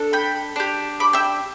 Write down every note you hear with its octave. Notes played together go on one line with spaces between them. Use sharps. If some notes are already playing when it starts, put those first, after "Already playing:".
Already playing: D4 A4
G5 B5
D4 G4
B5 D6
E5 G5